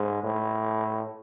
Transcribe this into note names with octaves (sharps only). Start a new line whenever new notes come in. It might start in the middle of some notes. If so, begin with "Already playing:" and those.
Already playing: G#2
A2